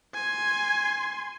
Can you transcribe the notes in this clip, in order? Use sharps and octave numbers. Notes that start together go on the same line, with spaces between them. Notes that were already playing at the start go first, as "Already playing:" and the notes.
G#5 C6